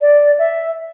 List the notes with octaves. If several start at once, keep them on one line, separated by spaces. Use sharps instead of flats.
D5
E5